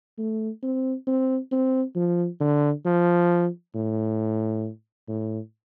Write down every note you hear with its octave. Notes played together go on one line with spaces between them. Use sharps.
A3
C4
C4
C4
F3
D3
F3
A2
A2